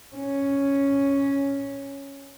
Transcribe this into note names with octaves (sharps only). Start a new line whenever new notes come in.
C#4